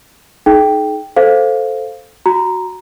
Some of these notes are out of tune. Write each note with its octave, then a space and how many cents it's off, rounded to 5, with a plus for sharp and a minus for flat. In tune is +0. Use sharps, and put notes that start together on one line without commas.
D#4 +0 G#4 +40 G5 +0
A4 +0 C5 +0 F5 +0
F#4 +0 A#5 +0